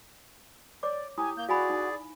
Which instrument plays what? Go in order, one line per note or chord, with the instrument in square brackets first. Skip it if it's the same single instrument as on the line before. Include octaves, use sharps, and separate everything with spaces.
[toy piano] C#5 D6 [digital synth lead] D5
[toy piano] E4 D#6 [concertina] G4 [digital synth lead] G#5
[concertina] A#3 [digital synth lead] G6
[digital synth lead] F#4 [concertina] G#4 D5 [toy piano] F5 G#5 B5
[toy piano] D#4